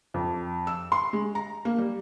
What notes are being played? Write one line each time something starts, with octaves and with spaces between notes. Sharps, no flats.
F2
E6
C6
G#3
A#5
A#3
G3